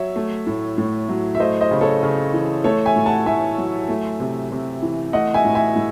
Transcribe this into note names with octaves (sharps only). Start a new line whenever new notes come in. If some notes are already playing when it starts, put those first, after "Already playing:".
Already playing: F#3 C#5 E5
A3
A2
A2
F#3
E5
A3 C5 D#5
C5 D#5
C#3
A4 C#5
C#3
E3
A3 A4 C#5
E5 G#5
A2
F#5 A5
A2 E5 G#5
F#3
A3
C3
C3
E3
A3 D#5 F#5
E5 G#5
A2
E5 G#5
A2